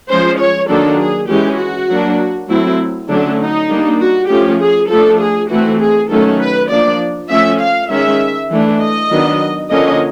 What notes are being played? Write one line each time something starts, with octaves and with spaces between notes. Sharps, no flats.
F3 G#3 C#4 C5
C#5
D#3 F#3 A#3 D4 A4
G#4
E3 G#3 C#4 G4
F#4
F#3 A#3 D4
F#3 A3 C4 E4
D3 F#3 A3 C#4 D4
D#4
G3 A#3 D4
F#4
F3 A3 C#4 G4
G#4
F3 A3 D4 A4
G#4
E3 A3 C4 F#4
G#4
D#3 F#3 A3 C#4 A4
B4
F3 A#3 D4 D5
F3 A3 C#4 E5
F5
D#3 G#3 C#4 E5
E3 A3 D4
D#5
D#3 F#3 B3 D4
D3 F3 A#3 C#4 D#5